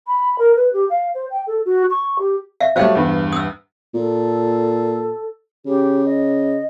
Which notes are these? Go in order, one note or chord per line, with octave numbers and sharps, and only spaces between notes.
B5
A#4
B4
G4
F5
C5
G5
A4
F#4
C#6
G4
E5 F5
F#3 G3 A3 C5 F5 G5
E2 G2
D#6 E6
A#2 A4
C#3 G4
D#5